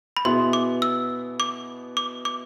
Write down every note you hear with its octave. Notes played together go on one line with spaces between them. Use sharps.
B5
B2 B3 E4 G#4 B4 C6
D6
E6
D6
D6
D6